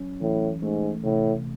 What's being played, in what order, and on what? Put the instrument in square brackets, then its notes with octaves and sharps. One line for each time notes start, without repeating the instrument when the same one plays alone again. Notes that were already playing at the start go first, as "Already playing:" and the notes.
Already playing: [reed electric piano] F#3 C#4
[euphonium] A2 [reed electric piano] E3
[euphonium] G#2 [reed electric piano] A3
[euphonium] A2 [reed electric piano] C3